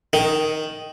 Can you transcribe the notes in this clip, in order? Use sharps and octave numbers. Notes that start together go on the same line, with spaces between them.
D#3